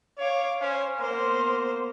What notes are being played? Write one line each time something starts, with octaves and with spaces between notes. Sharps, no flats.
C#5 F5 D6
C#4 C5
A#3 B3 C5 C6